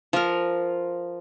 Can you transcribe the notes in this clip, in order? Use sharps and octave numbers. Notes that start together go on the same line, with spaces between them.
F3 A#4